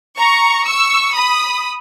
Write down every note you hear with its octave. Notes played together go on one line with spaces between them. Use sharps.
A#5 C#6
C#6 E6
B5 D#6